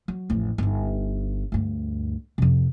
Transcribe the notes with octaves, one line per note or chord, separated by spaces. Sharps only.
F#3
A1 F2
G1 D#4
D2 G2
F2 C3